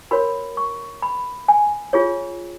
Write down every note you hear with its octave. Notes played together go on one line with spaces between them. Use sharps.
F#4 A#4 C#5 B5
C#6
B5
G#5
F4 G#4 C#5